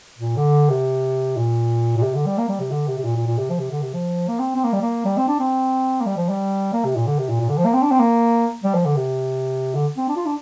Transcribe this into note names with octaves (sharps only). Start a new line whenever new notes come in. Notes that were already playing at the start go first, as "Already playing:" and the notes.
A#2
D3
C3
A#2
A#2
C3
D3
G3
A#3
G3
C3
D3
C3
C3
A#2
A#2
A#2
C3
F3
C3
D3
C3
F3
A#3
C4
C4
A#3
G3
A#3
G3
C4
D4
C4
A#3
G3
F3
G3
A#3
C3
A#2
D3
C3
A#2
A#2
D3
F3
A#3
C4
D4
C4
A#3
G3
F3
D3
C3
D3
C4
D4
F4
D4